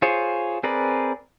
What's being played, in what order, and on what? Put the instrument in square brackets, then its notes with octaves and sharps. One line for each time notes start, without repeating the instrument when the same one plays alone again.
[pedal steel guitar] F4 G#4 C5 C#5
C4 G#4 A#4 B4 D5